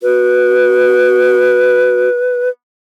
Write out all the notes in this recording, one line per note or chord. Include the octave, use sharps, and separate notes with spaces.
F#4 B4